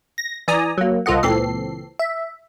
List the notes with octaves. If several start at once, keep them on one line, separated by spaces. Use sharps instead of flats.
A#6
E3 D5 G#5 A#5 D#6
F#3 A#3
C2 F4 A4 D#5 F#5
C#2 A#2 E3 C4 A4 C7
E5